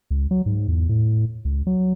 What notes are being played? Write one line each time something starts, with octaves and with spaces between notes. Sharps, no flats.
C#2
F#3
G#2
E2
A2
C#2
F#3